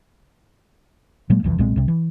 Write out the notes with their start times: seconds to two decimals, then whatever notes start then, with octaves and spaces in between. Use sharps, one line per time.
1.30 A#2 F#3 G#3 A#3
1.43 D1 C2 F2 E3
1.58 B1 A#2 G#3 C4
1.76 C2 C3
1.88 E3